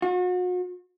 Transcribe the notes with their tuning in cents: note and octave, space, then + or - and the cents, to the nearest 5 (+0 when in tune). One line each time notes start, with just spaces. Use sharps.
F#4 -40